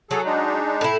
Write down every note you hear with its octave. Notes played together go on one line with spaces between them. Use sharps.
F#3 G#4 A4
G#3 D4 D#4
A2 E4